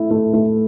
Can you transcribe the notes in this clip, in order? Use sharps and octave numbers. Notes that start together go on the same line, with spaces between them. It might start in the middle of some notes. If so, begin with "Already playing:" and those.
Already playing: A3 E4
A3
A3